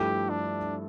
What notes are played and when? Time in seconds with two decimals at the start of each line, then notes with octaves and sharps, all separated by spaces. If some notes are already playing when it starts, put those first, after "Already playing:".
Already playing: G2 F3 A3 E4 G4 A4
0.30 D4